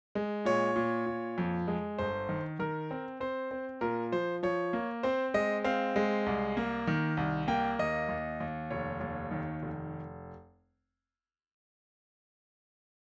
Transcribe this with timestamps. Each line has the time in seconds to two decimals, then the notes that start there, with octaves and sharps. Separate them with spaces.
0.15 G#3
0.45 A#2 C#5
0.76 A#2
1.06 A#2
1.38 F2
1.68 G#3
1.98 G1 C5
2.29 D#3
2.59 D#3 A#4
2.91 C4
3.20 C4 C5
3.51 C4
3.81 A#2 A#4
4.12 F3 C5
4.43 F3 C#5
4.73 A#3
5.03 C4 C5
5.34 G#3 D#5
5.64 C4 F5
5.96 G#3
6.26 C2
6.57 A#3
6.87 D#3
7.17 C2
7.48 A#3 G5
7.79 D#2 D#5
8.09 D#2
8.40 D#2
8.71 F1 C#5
9.00 D#2
9.31 D#3
9.63 F1